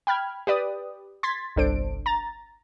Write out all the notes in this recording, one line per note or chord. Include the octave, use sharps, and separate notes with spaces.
G5 B5 F6 G#6
G4 B4 D5 D#6
C6 G#6 A6 B6
G1 C2 D4 A4 C5 D7
A#5 A6